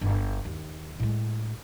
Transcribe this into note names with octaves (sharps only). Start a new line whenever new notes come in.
G1
D#2
A2 G#3